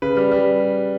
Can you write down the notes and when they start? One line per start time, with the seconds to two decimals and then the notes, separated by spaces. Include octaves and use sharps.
0.02 C#3 B4
0.17 G3
0.31 G3